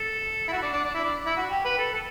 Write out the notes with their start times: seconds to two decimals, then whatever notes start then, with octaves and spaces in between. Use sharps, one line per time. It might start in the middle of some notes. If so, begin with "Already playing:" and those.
Already playing: A4
0.48 E4
0.52 F#4
0.62 D4
0.73 D4
0.83 D4
0.94 E4
1.04 D4
1.26 E4
1.37 F#4
1.50 G4
1.64 B4
1.78 A4
1.93 A4